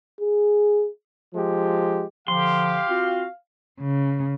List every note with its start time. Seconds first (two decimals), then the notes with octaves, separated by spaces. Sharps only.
0.21 G#4
1.34 F3 G#3 G4
2.28 D3 F3 G4 F5 C6
2.89 C4 F4 F#4
3.80 C#3